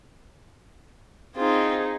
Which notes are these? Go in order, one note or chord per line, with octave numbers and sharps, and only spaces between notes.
C4 D#4 F4 G#4